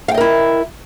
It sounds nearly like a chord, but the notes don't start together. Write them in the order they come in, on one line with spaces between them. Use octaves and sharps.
F5 G5 D#5 A#4 E4